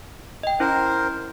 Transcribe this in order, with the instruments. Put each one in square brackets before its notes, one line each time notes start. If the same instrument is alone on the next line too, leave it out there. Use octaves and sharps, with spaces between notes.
[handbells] D#5 G5
[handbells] C#4 E4 [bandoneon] A#4 C5